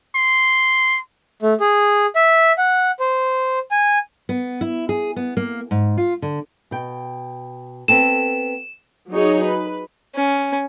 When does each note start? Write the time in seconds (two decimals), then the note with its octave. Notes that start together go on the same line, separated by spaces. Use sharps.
0.15 C6
1.42 A3
1.60 G#4
2.16 E5
2.58 F#5
3.00 C5
3.71 G#5
4.29 B3
4.61 E4
4.89 G#4
5.16 B3
5.37 A#3
5.71 G#2
5.98 F4
6.22 D3
6.71 B2 G5
7.88 B3 C4 A4 E7
9.11 F#3 D#4 G#4 C#5
9.44 B4
10.15 C#4